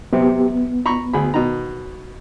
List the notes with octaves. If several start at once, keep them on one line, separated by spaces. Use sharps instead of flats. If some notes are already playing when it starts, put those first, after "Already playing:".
C3 F#3 B3 G4
B3
A#5 B5 C#6
D2 G#4 B5
B2 D#3 A#5